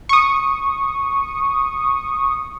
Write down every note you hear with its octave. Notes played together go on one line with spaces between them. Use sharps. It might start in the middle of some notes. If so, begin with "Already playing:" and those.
C#6 D#6